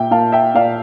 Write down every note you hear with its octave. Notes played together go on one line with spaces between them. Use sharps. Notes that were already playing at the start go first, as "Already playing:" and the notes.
Already playing: A#2 E5 G5
A#2 F5 A5
E5 G5
A#2 D5 F5